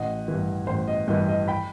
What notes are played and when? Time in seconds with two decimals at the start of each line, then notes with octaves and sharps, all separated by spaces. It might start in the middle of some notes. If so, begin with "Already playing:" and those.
Already playing: A1 D#5 F#5
0.28 G2 E3
0.67 A1 C5
0.87 D#5
1.08 G2 E3 D#5
1.29 D#5
1.48 G5 B5